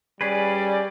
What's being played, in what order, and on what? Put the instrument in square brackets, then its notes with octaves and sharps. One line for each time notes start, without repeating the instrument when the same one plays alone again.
[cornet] G3 [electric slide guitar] C#4 G#4 B4 [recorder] D5